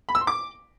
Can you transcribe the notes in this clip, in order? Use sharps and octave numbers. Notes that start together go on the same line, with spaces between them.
B5
E6
C6
D6